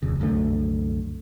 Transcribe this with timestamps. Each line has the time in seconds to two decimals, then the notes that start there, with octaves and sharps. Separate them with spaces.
0.02 D1 F2 C#3
0.20 C2 F#2 D3 A3